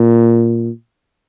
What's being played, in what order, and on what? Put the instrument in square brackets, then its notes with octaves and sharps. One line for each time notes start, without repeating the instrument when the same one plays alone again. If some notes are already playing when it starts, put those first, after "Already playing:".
Already playing: [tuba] A#2